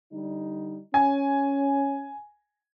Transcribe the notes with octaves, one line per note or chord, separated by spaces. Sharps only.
D3 G3 D#4
C#4 G#5